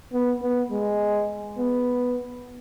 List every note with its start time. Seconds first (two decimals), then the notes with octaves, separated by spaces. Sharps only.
0.13 B3
0.42 B3
0.71 G#3
1.59 B3